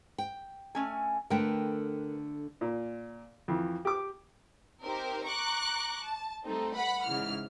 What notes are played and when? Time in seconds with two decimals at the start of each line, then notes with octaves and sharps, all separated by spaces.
0.18 G5
0.75 A3 C#4 G#5
1.30 D3 A3 A#4 B4 G5
2.61 A#2
3.48 F2 E3
3.85 G4 D6
4.83 C4 D#4 G4 A#4 C5
5.24 A#5 C#6 D6 F#6
6.03 A5
6.45 G3 A3 C4 D#4 A4
6.75 B4 F#5 B5
7.05 G#2 C#3 E3 F6